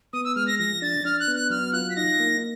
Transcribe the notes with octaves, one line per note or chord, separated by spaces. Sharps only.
B3 D#6
E6
G#3 F6
A#6
F3 A#6
D4 A6
D4 F6
F#6
B3
F#6
F#3 F6
F4 F#6
B6
D#4 A#6
A#3